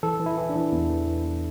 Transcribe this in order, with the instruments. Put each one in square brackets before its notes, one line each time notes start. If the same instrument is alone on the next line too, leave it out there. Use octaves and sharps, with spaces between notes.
[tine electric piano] E3 A4
E3
E4
E3
D4
E3
E2 B3
E2
E3
E2